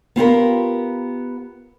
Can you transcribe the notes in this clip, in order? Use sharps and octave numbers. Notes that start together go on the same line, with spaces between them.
B3 F4 G4 A#4